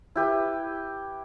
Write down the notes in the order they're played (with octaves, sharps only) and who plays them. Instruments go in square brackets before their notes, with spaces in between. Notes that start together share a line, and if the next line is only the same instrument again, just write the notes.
[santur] E4 G4 B4